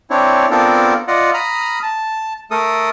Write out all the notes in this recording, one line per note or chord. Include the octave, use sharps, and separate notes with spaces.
C4 D4 E4 C#5
B3 C4 D4 F4 A4 A#4
F4 D5 D#5 F#5
A#5 B5 D#6 F6
A5
A3 A4 A#4 D#6